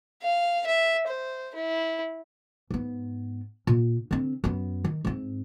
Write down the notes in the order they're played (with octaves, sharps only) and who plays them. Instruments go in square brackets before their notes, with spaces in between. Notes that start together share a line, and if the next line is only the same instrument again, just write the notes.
[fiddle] F5
E5
C5
E4
[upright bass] G#2 B3
A#2
D3 C4
F#2 B3
D#3
G#2 C4